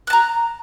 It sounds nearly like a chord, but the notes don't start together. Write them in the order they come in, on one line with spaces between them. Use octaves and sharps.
F#6 A5 A#5